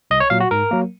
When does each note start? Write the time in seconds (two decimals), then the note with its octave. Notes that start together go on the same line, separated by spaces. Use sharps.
0.11 C2 D#5
0.20 C#5
0.30 A#2 F#3 F5
0.40 F#4
0.51 G#2 A#4
0.71 F#3 A#3